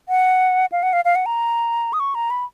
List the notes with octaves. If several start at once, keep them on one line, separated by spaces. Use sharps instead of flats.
F#5
F5
F#5
F5
F5
F#5
A#5
D#6
C#6
A#5
B5